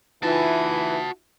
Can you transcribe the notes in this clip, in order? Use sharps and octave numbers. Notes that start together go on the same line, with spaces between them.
E3 D#4 F4 F#4 E5 A5